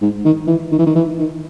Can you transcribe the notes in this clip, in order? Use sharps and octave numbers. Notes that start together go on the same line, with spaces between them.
G#2
D#3
E3
D#3
E3
D#3
E3
D#3